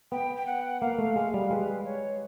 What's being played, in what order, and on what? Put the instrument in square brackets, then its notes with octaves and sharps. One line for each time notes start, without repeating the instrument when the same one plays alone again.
[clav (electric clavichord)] B3 [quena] G5
[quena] G5
F#5
[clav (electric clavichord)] A#3 [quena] F5
[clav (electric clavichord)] A3
[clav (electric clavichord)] G#3 [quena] F5
[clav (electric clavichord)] G3
[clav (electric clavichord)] G#3 [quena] B4
[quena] C#5